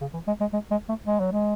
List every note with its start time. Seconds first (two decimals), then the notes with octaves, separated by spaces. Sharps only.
0.01 C#3
0.13 E3
0.27 G#3
0.40 G#3
0.53 G#3
0.71 G#3
0.89 A3
1.05 G#3
1.19 F#3
1.32 G#3